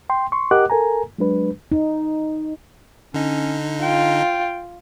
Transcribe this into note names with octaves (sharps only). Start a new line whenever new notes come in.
G5 C6
C6 C#6
G4 A#4 D#5 F#5 D6 F#6
A4 A#4 G#5 A#5
F#3 G#3 D4 B4
D#4
D3 C#4 D#4
F4 G5